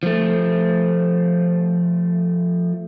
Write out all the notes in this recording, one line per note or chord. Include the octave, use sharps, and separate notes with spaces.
F3 A3